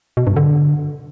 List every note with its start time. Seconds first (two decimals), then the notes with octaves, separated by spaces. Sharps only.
0.17 B2
0.27 G2
0.36 D3